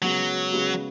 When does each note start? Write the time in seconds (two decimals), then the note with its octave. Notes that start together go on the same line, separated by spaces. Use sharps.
0.02 C#3 F#3 G#3 B3 F#4
0.52 C#3 G#3 B3 F#4